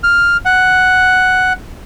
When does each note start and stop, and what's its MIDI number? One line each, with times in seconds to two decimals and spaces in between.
0.03 0.37 89
0.45 1.53 78